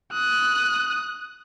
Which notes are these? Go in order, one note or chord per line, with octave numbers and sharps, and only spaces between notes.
D#6 F#6